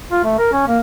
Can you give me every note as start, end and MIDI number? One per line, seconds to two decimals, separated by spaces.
0.11 0.23 65
0.24 0.34 57
0.39 0.48 70
0.53 0.64 61
0.67 0.79 58